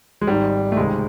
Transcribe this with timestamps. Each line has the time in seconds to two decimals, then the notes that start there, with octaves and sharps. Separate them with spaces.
0.21 G#3
0.27 G#1 G#2 D#3 G3
0.72 A3
0.77 C#2 C3 D#3 G#3